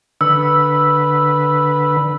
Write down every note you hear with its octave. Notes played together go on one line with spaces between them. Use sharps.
D3 B4 E6